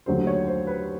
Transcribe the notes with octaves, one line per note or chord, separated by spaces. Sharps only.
D#2 D3 F#3 A3 C5
C#5
C5
B4